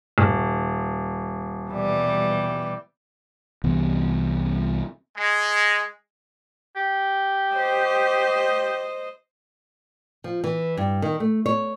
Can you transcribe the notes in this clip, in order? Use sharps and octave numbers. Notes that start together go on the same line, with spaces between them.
D#1
B2 E3 G3
C2 E3 B3
G#3
G4
C5 D#5
F3
E3
G2
D#3
A3
C#5